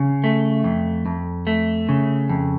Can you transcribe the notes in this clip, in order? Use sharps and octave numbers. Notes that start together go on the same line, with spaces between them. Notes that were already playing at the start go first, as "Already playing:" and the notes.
Already playing: C#3
A3
F2
F2
A3
C#3
F2